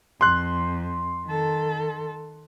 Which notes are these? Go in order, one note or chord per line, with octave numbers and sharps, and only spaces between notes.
F2 C6 F#6
D#3 A4